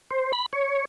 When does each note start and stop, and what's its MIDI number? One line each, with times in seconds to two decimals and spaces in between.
0.11 0.32 72
0.33 0.46 83
0.53 0.85 73